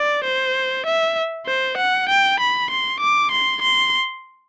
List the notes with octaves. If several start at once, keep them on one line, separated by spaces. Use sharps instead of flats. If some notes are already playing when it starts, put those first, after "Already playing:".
Already playing: D5
C5
E5
C5
F#5
G5
B5
C6
D6
C6
C6